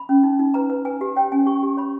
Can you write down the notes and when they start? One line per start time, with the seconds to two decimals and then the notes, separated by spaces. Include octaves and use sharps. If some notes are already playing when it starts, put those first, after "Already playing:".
Already playing: B5
0.09 C#4
0.23 D#4
0.39 D#4
0.54 B4 A#5
0.70 B4
0.85 B4 G#5
1.01 G4
1.16 C#5 G5
1.32 C#4 G#5
1.46 G4 C#6
1.63 G4
1.77 C#5 B5